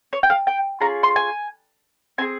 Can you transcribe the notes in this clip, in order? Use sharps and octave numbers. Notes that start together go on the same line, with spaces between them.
C#5
G5
F5
G5
C#4 F4 G#4 A#5
C6
G#5
C4 E4 G#4 G#5